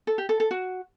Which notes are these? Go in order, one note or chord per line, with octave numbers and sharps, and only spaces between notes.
A4
G4
A4
A4
F#4